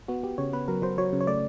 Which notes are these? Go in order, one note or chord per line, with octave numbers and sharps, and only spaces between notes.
B3 F#4
B3 G4
C#3 C#5
B3 B4
F#3 A#4
F#3 C5
F#3 C#5
C#3
C#5
A3 D5